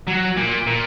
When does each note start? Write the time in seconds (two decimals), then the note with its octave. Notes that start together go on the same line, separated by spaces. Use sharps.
0.07 F#3
0.36 A#2
0.67 A#2